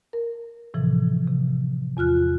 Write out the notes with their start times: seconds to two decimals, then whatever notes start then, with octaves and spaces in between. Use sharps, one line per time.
0.13 A#4
0.74 A2 C3 E3 F3
1.27 C3
1.97 E2 F4 F6 F#6